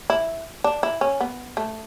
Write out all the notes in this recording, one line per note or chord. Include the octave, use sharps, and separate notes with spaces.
E4
D4
E4
C#4
B3
A3